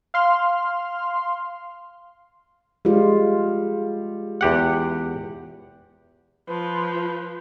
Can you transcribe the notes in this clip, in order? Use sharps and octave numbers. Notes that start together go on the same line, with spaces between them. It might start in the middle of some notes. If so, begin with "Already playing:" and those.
F5 C6 F6
G3 G#3 F4
E2 G4 F#5
F3 B4